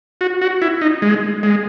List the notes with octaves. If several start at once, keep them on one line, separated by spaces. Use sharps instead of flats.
F#4
F#4
E4
D#4
G#3
G#3